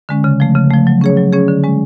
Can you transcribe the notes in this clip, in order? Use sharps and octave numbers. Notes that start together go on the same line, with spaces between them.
D3 G#3 C#4
C#3
F3 A3
C#3
F3 A3
F#3
C#4 G#4 C#5
F#3
C#4 G#4 C#5
D3
G#3 C#4